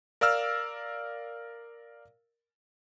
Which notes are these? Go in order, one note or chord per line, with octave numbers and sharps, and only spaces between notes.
A#4 D5 F5 E6 F6